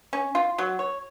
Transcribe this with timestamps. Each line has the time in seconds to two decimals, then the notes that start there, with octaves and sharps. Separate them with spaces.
0.13 C#4
0.35 F4
0.58 F#3
0.79 C#5